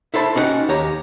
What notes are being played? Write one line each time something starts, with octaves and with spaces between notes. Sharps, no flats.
E4 A4 C5 A5 B5
C#4 D#4 E4 F#4 F#5 G5
D#2 G4 C#5 A#5